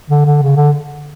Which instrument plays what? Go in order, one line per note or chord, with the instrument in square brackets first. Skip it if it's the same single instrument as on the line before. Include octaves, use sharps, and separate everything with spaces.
[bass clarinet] D3
D3
C#3
D3